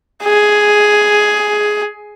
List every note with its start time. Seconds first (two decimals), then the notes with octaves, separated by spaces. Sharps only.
0.23 G#4